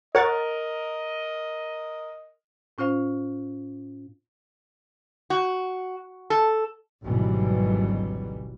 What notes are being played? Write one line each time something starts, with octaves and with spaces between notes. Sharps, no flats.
A#4 C#5 D#5 F#5 A6
A2 C#4 F4 C5 F5
F#4
A4
G#1 D2 B2 E3 F#3 G3